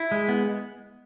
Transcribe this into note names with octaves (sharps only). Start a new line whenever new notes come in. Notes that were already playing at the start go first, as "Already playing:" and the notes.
Already playing: E4
G#3
B3